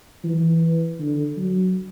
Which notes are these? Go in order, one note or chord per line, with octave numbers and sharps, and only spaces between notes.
E3
D3
F#3